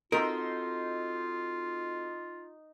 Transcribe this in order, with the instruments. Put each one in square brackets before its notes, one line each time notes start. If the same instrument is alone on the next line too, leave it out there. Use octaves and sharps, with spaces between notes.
[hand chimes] C4 F#4 A4 [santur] D#4 C6 E6 [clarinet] F4 [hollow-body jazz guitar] A#4